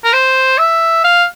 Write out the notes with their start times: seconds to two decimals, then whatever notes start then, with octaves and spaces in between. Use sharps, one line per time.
0.04 A#4
0.13 C5
0.58 E5
1.04 F5